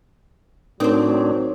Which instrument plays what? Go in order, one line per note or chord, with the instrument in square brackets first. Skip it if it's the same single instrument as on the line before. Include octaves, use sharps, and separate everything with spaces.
[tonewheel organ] A2 D4 [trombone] F#3 [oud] C4 C5 [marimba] D#4 A#4